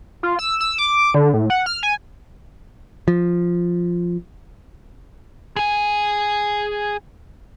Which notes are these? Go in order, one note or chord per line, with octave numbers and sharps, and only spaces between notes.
F4
E6
E6
D6
D3
A2
F#5
F6
G#5
F3
G#4 G#5